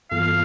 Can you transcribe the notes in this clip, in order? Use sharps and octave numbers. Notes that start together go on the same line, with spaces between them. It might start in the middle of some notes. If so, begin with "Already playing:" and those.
G2 E3 B3 F4 A4 F5